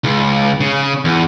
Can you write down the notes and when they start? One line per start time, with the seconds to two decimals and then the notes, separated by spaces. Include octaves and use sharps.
0.04 C#2
0.61 C#3
1.05 E2